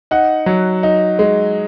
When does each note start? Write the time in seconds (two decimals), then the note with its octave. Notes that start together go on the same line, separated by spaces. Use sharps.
0.11 D#4 F#5
0.46 F#3
0.83 D#4
1.19 G#3